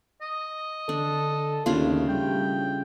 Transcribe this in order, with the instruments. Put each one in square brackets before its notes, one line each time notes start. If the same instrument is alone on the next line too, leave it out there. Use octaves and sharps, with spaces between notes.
[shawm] D#5
[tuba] D3 [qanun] D4 [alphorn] A4
[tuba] D#2 [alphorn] A2 [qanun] C#3 D4 F4
[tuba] G3 [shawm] G5